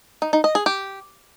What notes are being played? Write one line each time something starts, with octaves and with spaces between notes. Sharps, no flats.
D#4
D#4
D#5
G#4
G4